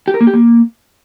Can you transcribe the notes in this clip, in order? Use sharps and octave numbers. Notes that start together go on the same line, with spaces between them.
G4
A#4
A#3
G4
A#3